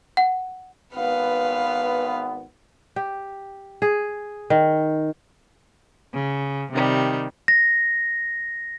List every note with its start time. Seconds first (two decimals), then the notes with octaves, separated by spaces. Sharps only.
0.17 F#5
0.94 G#1 B3 B4 F5
2.96 G4
3.82 G#4
4.50 D#3
6.14 C#3
6.72 C3 D#3 G3
7.48 A#6